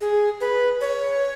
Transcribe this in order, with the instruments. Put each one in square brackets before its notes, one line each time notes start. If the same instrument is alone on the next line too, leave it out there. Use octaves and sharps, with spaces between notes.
[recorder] G#4
B4
C#5